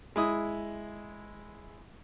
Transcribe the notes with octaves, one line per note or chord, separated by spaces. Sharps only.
G#3 E4 D#6